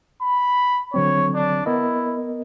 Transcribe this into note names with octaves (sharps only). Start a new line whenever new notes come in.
B5
D3 F#3 C4 C#5
D4
B3 E4 A#4 D#5